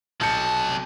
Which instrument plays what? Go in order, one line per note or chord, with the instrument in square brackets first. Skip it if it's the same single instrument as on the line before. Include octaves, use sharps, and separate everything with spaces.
[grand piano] B1 G6 C#7 [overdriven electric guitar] C3 A5